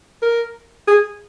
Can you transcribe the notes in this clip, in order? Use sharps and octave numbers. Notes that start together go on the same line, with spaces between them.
A#4
G#4